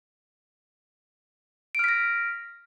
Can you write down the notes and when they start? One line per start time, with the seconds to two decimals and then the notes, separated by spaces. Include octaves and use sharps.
1.75 D7
1.79 F6
1.84 B6
1.89 A#6